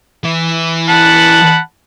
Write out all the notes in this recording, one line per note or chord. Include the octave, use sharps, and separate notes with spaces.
E3
F#5 A5 B5